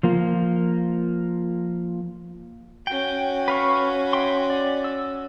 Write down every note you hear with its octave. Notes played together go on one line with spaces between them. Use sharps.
F3 A#3 F4
C#4 F#4 G5
B4 F5 C#6
E5 G5 C6
D5
E6